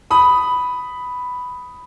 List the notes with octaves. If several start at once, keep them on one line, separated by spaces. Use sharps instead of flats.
B5 D#6